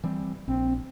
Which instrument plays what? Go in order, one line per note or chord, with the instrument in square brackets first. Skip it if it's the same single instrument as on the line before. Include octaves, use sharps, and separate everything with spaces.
[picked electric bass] E3 G3 C4
[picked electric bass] A#1 [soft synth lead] C4